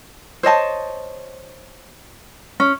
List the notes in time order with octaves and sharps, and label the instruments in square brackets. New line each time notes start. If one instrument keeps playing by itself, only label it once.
[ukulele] C5 C#5 D#5 A5
C#4